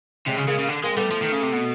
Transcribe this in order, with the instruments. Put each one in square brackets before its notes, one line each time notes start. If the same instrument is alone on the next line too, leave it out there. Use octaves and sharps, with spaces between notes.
[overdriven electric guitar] C3 [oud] F#3 G#3
[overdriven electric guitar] C#3
[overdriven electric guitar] C#3 [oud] G#3 A#3
[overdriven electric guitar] C#3
D3
[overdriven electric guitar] G#3 [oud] A#3 C4
[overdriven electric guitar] G3 [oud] A3 B3
[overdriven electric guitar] F3
D#3
C#3
C3
B2